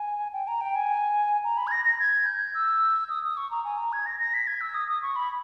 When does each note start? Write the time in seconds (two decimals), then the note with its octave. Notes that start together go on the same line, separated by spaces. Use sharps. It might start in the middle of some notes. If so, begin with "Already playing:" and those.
Already playing: G#5
0.33 G5
0.48 A#5
0.61 G5
0.75 G#5
1.44 A#5
1.57 B5
1.67 G#6
1.72 A#6
1.85 A#6
1.99 G#6
2.26 G6
2.54 E6
3.10 D#6
3.24 D#6
3.37 C#6
3.51 A#5
3.64 G#5
3.78 A#5
3.93 G#6
4.06 A#6
4.20 A#6
4.34 B6
4.47 G#6
4.61 E6
4.74 D#6
4.89 D#6
5.03 C#6
5.16 B5